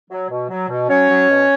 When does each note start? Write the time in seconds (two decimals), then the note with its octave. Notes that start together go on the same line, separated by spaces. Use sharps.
0.09 F#3
0.29 B2
0.49 F#3
0.68 B2
0.88 F#3 C#4 C#5
1.09 F#3
1.28 B2